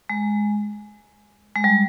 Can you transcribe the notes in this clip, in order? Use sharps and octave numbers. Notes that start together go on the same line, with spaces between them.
G#3
G#3
G3